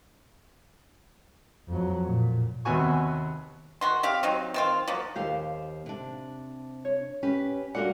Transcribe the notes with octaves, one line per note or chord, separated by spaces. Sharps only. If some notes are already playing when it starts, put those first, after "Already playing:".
F2 F#3
A#2
D#2 C3 B3 F#4 G#5 C#6
D#3 F#4 C6
C4 G4 F5
F#3 C4 D#4
D#3 C4 F4
F3 F#3 A#3
D#2 G4 C5 F5
C3 D4
C#5
C#4 G4 B4
G3 A#3 D4 F#4 A#4 F#5